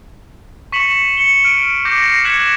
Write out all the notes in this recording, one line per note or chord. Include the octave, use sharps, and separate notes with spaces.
C#6 B6 C#7 E7 F#7
C#7 G7
F6 D7 D#7
D6 G6 A#6 C7
A#6 C7
F#6 G#6 B6 C#7 E7 F#7